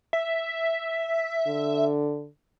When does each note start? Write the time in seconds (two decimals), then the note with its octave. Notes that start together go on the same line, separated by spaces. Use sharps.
0.13 E5
1.46 D3